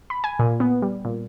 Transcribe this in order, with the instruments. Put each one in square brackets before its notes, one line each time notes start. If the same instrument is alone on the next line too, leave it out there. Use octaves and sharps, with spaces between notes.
[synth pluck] B5
G#5
A#2
B3
G3
A#2